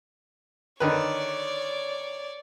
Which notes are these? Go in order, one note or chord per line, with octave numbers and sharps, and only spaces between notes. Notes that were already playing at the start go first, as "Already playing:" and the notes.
D3 D#3 B4 C#5 D5